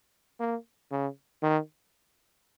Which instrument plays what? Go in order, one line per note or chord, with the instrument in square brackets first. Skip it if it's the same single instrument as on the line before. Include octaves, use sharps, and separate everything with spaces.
[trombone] A#3
C#3
D#3